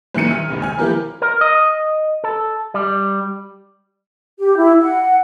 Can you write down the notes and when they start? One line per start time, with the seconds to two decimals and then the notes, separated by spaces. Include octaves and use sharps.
0.15 C2 D#3 E3 F#3 C#7 D#7
0.31 F6
0.49 F#1 C#2 C3 D#3
0.62 G#5 F6
0.78 F3 B3 E4 G4 A#4 B4
1.22 A#4
1.41 D#5
2.24 A4
2.74 G3
4.38 G4
4.57 E4
4.81 F#5